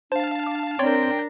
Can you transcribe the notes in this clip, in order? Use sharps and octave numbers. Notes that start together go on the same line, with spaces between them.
D4 C5 F5 A5
D6
C4 D4 A#4 C#5 D5 G5 C6